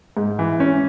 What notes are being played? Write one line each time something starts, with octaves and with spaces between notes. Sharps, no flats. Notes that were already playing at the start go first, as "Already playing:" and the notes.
G#2
E3
C#4